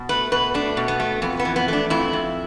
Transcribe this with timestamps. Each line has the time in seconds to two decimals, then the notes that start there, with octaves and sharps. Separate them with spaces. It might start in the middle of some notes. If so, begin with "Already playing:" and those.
Already playing: B2
0.09 A3 B4
0.32 B2 B4
0.54 A3 D4
0.77 B2
0.88 B3
1.00 A3
1.22 F2 B3
1.40 B3
1.45 E3
1.56 B3
1.68 A3 D4
1.90 F2 E4
2.13 F2